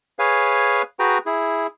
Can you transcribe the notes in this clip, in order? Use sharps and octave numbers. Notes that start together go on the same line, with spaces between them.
G#4 B4 C#5 F5 G#5
F#4 G#4 B4 G5 A#5
E4 G#4